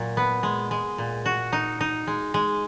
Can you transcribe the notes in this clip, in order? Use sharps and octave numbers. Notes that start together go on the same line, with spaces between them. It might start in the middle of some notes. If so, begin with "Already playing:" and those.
Already playing: A#2 F#3
B3
G#3
G#3
A#2
F#4
D#4
D#4
G#3
G#3